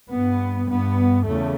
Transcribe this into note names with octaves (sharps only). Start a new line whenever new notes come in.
G2 B3
G2 B3
E2 C#3 A3